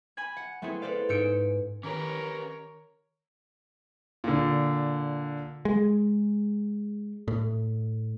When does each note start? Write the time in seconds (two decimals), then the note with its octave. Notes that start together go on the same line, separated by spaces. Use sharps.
0.17 G#5 B5 G#6
0.37 F#5
0.62 A3 B3 C4 E4 G#4
0.82 A4 B4 C5 D5 F5
1.09 G#2 C#4 E6 G6 C#7 D7
1.83 D#3 C#4 G4 A#4 B4 C#5 A#5
4.24 A#2 D3
5.65 G#3
7.28 A2